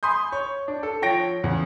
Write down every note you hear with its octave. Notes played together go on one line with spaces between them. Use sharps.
G#5 B5 C6 D#6 G6
C#5
D4
A4
F3 C#5 G5 A#6 D7
E2 C#3